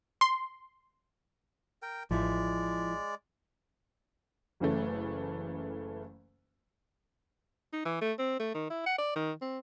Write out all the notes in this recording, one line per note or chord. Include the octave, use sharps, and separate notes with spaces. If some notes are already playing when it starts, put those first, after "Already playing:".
C6
A#4 G5
A1 F3 G#3 E4 D5
F#1 C#3 E3 A3
D#4
E3
A3
C4
A3
D#3
E4
F#5
D5
D#3
C4